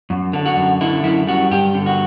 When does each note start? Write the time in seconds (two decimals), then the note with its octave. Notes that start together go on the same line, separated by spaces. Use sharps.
0.10 F#2
0.33 D3
0.46 F#4
0.57 F#2
0.81 D3 E4
1.04 F#2 E4
1.27 G3 F#4
1.51 G2 G4
1.74 D3
1.86 F#4